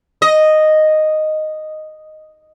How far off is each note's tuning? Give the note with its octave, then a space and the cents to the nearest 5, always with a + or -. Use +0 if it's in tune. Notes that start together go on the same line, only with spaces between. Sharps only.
D#5 -5